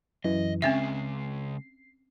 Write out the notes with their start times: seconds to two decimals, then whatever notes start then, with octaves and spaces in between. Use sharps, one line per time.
0.24 F#2 E3 D#5
0.62 C#3 G#3 C4 C#4 E5 C7